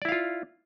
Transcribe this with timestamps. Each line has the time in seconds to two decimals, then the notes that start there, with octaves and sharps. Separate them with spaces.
0.02 D5
0.05 E4
0.09 F5
0.12 F4